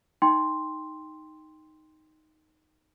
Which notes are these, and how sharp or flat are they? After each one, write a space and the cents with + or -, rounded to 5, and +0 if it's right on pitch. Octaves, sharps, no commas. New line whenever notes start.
D#4 +0 G5 +15 C6 +0